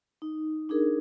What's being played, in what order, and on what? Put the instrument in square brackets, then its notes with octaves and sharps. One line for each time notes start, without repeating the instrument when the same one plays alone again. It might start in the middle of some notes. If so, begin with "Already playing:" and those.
[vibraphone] D#4
D4 D#4 G#4 A#4